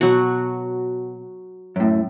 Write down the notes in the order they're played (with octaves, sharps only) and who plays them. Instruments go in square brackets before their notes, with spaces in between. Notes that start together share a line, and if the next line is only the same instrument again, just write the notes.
[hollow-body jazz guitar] B2 [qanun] F#3 F#4
[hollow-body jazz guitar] F#2 A2